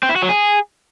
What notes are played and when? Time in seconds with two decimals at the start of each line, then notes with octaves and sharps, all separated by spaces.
0.03 C4
0.09 E4
0.16 F#4
0.22 F#3
0.29 G#4